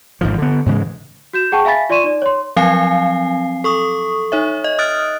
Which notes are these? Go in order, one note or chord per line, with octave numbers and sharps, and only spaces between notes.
G#1 G#2 F3
D3 B3
G#2 C#3 E3 G#3
F#4 G6 E7
G#4 F#5 G5 A5 C#6
E5 F5 G#5 B5 A6 B6
F4 D5 C6 C#6 D#7 E7
D#4 D5
C#5 C6
F3 F#3 C4 F5 G#5 C7
A4 C#6 D#6
D#4 C#5 E5
D#5
D#6 F6 F#6 A6 D7